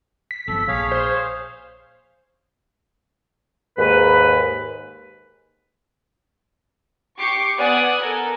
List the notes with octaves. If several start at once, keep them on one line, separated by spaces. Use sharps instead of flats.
B6
G1 B2 F3 A4
A#1 G#4 C#5 F5
C5
D#2 G#2 B4
G4 C#6 D6 C7 C#7
B3 D5 F#5 G#5 D#6 F#6
A4 A#4 G#5